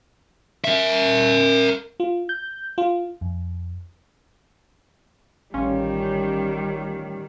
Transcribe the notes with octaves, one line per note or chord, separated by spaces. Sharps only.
A#4 E5
F4
G6
F4
F2
A1 D#3 G3 C#4 F4